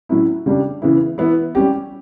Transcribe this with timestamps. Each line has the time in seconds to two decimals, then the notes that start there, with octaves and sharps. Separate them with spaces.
0.09 A2 F#3 C#4 E4
0.46 C#3 G3 D4 G4
0.82 C#3 E3 B3 E4
1.18 E3 B3 E4
1.55 G3 C#4 G4